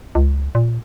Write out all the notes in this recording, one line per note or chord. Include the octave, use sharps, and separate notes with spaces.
C#2
A#2